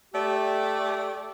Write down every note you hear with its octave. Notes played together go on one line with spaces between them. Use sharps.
A3 G4 D5